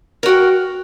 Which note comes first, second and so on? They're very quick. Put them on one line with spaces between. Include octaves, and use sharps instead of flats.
A#4 F#4 G5